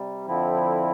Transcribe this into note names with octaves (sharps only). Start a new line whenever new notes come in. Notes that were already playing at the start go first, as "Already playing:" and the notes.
Already playing: C3 G3
F2 D3 F3 C4 E4